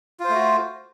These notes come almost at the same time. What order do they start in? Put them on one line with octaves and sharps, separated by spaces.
F4 C5 A3 F#4